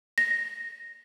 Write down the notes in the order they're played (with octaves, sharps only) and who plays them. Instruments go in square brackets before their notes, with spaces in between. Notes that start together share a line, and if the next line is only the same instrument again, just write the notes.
[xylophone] A#6